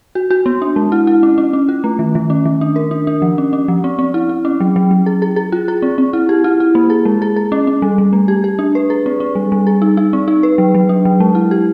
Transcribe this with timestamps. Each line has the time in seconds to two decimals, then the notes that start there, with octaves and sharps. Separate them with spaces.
0.15 F#4
0.31 F#4
0.46 B3
0.62 D4
0.76 G#3
0.92 E4
1.07 E4
1.23 C#4
1.38 C#4
1.53 C#4
1.69 F4
1.84 A3
1.99 D#3
2.15 D#3
2.30 C#4
2.45 D#3
2.61 D4
2.76 A#4
2.91 D4
3.07 D4
3.22 F3
3.38 C#4
3.53 C#4
3.68 F3
3.84 C4
3.99 C4
4.14 E4
4.29 E4
4.45 C#4
4.60 F#3
4.76 F#3
4.91 F#3
5.06 G#4
5.22 G#4
5.36 G#4
5.52 F4
5.68 G#4
5.82 C4
5.98 C4
6.13 E4
6.29 G4
6.44 E4
6.60 E4
6.75 A#3
6.90 G#4
7.05 G#3
7.22 G#4
7.36 G#4
7.52 C#4
7.67 C#4
7.82 G3
7.98 G3
8.13 A3
8.28 G4
8.44 G4
8.59 D4
8.75 B4
8.90 G#4
9.06 C4
9.20 C4
9.35 G3
9.52 G3
9.67 G#4
9.82 D#4
9.97 D#4
10.13 C4
10.28 D#4
10.43 B4
10.58 F#3
10.75 F#3
10.89 D4
11.05 F#3
11.20 G#3
11.35 E4
11.51 G4